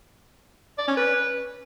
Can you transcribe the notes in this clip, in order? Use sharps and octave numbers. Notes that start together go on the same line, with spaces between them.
D5
C#4
B4